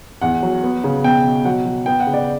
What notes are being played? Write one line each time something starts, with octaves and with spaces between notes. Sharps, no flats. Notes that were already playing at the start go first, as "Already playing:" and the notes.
E2 F#5
F#3
B3
C#3
B2 G5
B2
F#3 F#5
F#3
B3 G5
F#5
C#3
D5